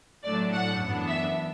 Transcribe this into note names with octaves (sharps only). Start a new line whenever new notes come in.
A2 F#3 A3 D4 D5
F#5
F#2 E3 B3 D4
E5